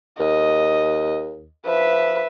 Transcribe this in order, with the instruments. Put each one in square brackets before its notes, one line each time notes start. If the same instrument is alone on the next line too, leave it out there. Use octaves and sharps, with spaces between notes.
[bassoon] D#2 [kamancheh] D#5
[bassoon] F3 [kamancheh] B4 E5